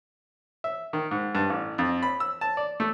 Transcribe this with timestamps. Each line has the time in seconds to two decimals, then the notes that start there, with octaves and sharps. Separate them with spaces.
0.64 E5
0.93 D#3
1.11 G#2
1.35 G2
1.50 A1
1.78 F2
2.03 B5
2.20 E6
2.41 A5
2.57 D5
2.80 A3